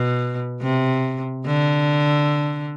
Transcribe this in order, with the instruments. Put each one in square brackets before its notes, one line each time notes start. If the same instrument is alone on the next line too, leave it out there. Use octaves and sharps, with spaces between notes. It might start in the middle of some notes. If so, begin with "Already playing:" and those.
Already playing: [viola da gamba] B2
C3
D3